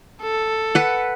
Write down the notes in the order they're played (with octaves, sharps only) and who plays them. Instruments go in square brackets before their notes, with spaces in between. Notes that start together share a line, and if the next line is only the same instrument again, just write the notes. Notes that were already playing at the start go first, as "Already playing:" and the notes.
[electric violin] A4
[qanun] B4 F#5